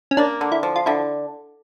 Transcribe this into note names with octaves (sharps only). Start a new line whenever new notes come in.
C#4
A#3 D4
D3
E4
F3
F4
D3 E4